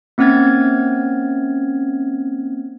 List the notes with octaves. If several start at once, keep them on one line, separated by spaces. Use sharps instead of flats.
A#3 C4 C#4 F6 G#6 A6